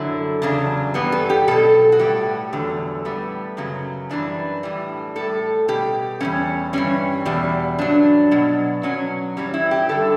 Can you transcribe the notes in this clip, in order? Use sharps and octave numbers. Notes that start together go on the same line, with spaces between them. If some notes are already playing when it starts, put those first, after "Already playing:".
Already playing: F#2 D3 F#3 E4
E2 C#3 F#3 D4
G2 E3 G3 B3
A4
G4
B2 F#3 A4
F#4
A2 G3 G4
E2 D3 F#3
A2 G3 B3
F#2 C#3 F#3
F#2 E3 G3 D4
A2 E3 G3
A2 G3 A4
B2 G3 G4
E2 B2 G3 C#4
G2 E3 G3 C#4
E2 B2 G3
G2 F#3 D4
B2 F#3
B2 F#3 C#4
G2 E3 G3 C#4
E4
G4
G2 D3 G3 A4